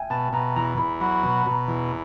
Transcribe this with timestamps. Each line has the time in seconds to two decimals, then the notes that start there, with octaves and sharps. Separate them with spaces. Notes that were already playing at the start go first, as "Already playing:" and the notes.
Already playing: E5 F5 G5 G#5
0.10 B2 A5
0.33 B2 A#5
0.56 E2 A#5
0.78 E2 B5
1.01 F#3 B5
1.23 B2 B5
1.32 A#5
1.42 B2 A5
1.52 A#5
1.68 E2